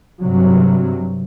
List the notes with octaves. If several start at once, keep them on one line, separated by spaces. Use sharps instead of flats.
G2 C3 F#3